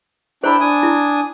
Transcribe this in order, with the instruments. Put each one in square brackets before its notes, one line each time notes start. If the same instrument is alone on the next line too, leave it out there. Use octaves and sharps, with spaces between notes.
[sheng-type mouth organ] D4 E4 G5 [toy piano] C5 A#5 B5
[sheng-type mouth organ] D4 G#5 D#6
[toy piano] E4